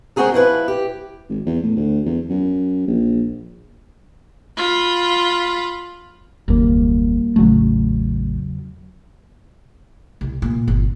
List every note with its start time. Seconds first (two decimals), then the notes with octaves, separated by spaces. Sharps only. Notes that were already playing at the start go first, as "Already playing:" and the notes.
0.16 G#3 C4 C#4 F#4 G#4 A#4
0.34 F3 E4 B4
0.68 G4
1.29 G#1
1.46 E2
1.63 A2
1.77 D2
2.06 E2
2.29 F#2
2.87 A#1
4.57 F4 B5
6.48 F#1 D#2 G3 A#3
7.36 A1 E2 C#3 F#3 A3
10.21 C2
10.42 A#2
10.68 G1